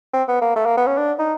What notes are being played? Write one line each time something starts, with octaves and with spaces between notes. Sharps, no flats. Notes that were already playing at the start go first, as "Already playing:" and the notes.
C4
B3
A#3
A3
A#3
B3
C#4
D4
D#4